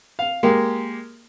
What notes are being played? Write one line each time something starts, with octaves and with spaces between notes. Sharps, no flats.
F5
G#3 A#3 G4